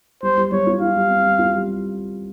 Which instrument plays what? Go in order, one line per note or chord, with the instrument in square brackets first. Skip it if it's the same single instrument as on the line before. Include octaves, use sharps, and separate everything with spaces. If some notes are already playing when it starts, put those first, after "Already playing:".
[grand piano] G3 [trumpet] C5
[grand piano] G3
[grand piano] G3 [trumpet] C#5
[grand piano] F4
[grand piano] F4 [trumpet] F5
[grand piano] G3
C4
G3
F4
G3